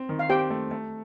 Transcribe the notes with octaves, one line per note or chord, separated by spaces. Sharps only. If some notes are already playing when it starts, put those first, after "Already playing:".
Already playing: C4
D#3
F5
C4 G4 G5
A3
A3